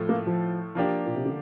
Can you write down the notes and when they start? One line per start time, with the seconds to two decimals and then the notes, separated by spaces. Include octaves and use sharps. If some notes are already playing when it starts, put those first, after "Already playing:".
Already playing: A2 F3 A3
0.09 A#3
0.27 F3
0.75 F3 A#3 D4 G4
1.06 A#2
1.15 C3
1.26 D3